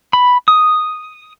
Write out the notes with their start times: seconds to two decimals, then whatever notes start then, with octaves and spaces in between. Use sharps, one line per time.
0.13 B5
0.48 D#6